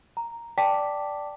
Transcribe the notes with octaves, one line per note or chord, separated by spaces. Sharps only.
A#5
D5 G5 A5 D6 B6